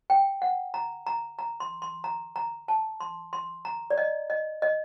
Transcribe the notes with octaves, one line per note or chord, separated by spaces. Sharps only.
G5
F#5
A#5
A#5
A#5
C6
C6
A#5
A#5
A5
C6
C6
A#5
D5
D#5
D#5
D#5